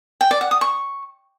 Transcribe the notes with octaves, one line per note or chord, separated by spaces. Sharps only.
G5
D5
F#5
D#6
C#6